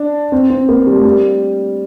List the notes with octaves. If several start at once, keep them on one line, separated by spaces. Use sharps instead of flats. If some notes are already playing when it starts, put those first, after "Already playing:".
Already playing: D4
C4
C4
A#3
G3
A3
G3